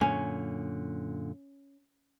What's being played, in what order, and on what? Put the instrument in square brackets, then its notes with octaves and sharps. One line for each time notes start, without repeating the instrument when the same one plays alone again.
[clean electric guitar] F#2 A#2 D3 [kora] C#4